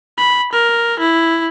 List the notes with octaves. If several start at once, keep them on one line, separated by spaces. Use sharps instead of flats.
B5
A#4
E4